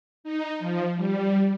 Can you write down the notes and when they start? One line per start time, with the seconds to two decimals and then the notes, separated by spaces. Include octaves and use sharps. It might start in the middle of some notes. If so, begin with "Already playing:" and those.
0.24 D#4
0.59 F3
0.96 G3